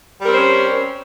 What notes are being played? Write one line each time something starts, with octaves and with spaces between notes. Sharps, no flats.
G3 C4 C#4 A#4 C5